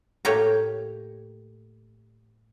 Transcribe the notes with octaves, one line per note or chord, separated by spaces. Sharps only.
A2 A3 A#3 G4 C#5 A#5